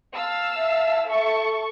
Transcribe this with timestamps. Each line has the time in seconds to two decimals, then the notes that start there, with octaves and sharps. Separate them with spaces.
0.15 F5 A5 E6
0.57 E5
1.07 A4 A5 C#6